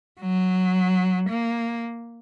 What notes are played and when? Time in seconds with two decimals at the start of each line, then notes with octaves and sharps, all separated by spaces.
0.20 F#3
1.29 A#3